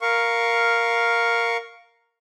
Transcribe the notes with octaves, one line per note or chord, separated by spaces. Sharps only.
A#4 F5 C#6